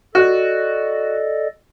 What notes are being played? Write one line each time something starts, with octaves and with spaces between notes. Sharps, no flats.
F#4 A4 D5 D#5